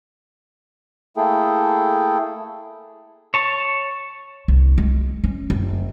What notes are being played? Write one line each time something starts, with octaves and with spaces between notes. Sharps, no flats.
A3 A#3 E4 G#4 A4 G5
C#5 A5
C2
G#3
C#4
F#1